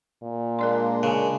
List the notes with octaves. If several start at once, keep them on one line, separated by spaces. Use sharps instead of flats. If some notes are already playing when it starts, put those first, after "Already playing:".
A#2
G#3 A#3 D4 A#4 D5 C6
C#3 A#4 G#5